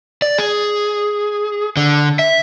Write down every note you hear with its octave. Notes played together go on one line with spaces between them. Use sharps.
D5
G#4
D3
E5